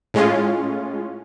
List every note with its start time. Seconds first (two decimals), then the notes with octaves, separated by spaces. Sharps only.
0.14 A2 G#3 C#4 F4